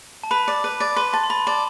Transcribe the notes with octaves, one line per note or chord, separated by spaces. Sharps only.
A5
B4 B5
D5
B4
D5
B4 C6
A5 C6
C6
A5 B5
D5 A5